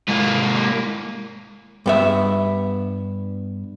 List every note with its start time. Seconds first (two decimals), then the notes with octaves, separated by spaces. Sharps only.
0.08 G#2 A#3
1.86 G2 B3 E5